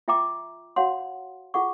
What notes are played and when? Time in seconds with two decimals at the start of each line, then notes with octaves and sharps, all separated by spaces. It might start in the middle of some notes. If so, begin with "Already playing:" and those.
0.08 F4 E5 G5 A#5 D6
0.76 F#4 C#5 F5 F#5 C6
1.54 F4 G#4 F#5 C#6